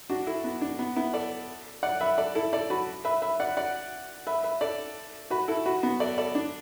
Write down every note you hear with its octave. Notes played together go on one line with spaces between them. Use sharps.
D4 F#4
E4 A4
B3
D4
B3
B3 E4
A4 D5
D5 F#5
B4 E5
A4 D5
E4 A4
A4 D5
F#4 B4
B4 E5
B4 E5
D5 F#5
D5 F#5
B4 E5
B4 E5
A4 D5
F#4 B4
E4 A4
F#4 B4
B3
A4 D5
A4 D5
D4